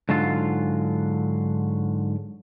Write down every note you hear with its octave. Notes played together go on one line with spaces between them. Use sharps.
G#2 D3 F#3 F4